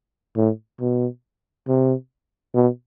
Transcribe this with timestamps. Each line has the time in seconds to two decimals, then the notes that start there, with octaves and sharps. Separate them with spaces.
0.36 A2
0.80 B2
1.68 C3
2.55 B2